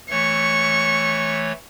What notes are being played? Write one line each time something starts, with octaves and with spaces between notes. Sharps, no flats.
E3 A3 C#5 C#6